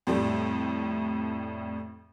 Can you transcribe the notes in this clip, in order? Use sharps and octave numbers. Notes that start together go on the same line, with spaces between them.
F2 A2 G3 A3